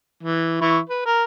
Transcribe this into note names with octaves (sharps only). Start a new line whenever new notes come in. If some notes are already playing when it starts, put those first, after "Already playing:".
E3
E3 E4 C#6
B4
A#4